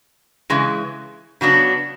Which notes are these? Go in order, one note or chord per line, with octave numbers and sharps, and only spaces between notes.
C#3 E3 G#3
C#3 F#3 B3 D4